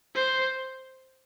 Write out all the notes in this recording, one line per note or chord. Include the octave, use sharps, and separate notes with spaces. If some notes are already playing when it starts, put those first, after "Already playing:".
C5